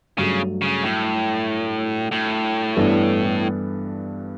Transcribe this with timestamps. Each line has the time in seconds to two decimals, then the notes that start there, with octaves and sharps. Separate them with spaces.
0.18 G2 C#3 F#3 A3
0.62 C#3
0.83 A2
2.12 A2
2.77 G2 E3 B3 D4 A4